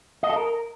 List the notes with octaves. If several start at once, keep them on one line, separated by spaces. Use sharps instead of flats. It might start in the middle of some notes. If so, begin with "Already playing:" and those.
D#5
A4
A#4